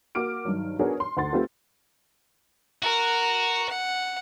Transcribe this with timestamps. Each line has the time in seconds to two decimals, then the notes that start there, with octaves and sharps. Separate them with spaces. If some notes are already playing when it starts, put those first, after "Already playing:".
0.15 A#3 F#4 D6 F6 D7
0.45 G2 D#3 F#3
0.79 B3 D4 F#4 G#4 A#4 C#5
1.00 C6
1.17 D2 F#5 C6 A6
1.32 A3 C4 F4 G4 A4 B4
2.83 F#4 A#4
3.69 F#5